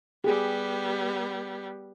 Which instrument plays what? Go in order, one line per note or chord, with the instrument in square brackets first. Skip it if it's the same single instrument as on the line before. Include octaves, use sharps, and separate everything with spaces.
[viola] G3 B3 [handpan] G4 G#4